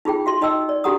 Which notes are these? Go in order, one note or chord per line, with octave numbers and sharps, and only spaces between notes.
D#4 F4 G#4 G5
F#4 E5 C6
D#4 D#5 G5 E6
D5
D4 F#4 G4 F#5 A#5 D#6